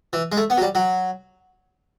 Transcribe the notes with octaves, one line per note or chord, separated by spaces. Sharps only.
E3
G#3
A3
B3
F#3
G3
F#3